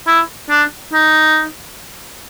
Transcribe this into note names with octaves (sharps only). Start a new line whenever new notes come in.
E4
D4
D#4